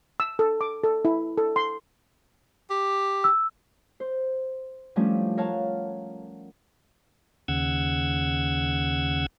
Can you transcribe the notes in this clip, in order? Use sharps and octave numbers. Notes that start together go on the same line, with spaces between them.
E6
A4
D6
A4
E4
A4
C6
G4
E6
C5
F3 G3 A3 C#4 D4 E4
A#4 C#5 F5 F#5 A5
D#2 C#3 F#5 E6 G#6